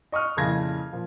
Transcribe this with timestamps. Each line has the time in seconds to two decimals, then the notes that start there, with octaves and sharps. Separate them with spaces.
0.12 D#5 C#6 D#6 F6 F#6
0.37 F2 A#2 C#3 E4 G#6 A#6
0.92 A#2 F3